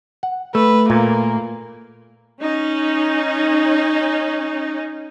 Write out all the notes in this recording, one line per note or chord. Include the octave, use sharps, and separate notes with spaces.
F#5
A3 B4
A#2 A#3
C#4 D#4